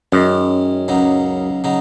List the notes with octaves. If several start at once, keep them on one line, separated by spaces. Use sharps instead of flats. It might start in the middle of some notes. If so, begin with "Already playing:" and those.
F#2 D#3 G#3 C#4
C#2 C#3 F#3 D#4
C#3 F#3 D#4